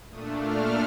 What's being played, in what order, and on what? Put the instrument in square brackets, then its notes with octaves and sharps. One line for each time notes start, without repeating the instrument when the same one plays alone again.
[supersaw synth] A#2 A3 D4 D#6
F6